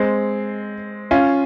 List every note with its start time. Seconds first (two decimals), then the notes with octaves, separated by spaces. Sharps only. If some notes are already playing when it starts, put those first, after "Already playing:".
Already playing: G#3 C4
1.11 C#4 F4